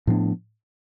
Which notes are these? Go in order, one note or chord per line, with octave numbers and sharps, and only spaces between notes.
A2 F3 B3 D4